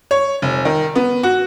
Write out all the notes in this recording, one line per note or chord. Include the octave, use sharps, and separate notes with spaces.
C#5
F1
D#3
B3
F#4